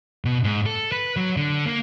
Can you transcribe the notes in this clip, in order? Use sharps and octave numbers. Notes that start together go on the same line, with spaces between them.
B2
G#2
A4
B4
F#3
D3
A#3